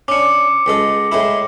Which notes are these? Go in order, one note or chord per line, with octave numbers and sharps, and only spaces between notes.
C#4 D4 D6 C#7
C#2 G#3 A4
A2 G#3 E4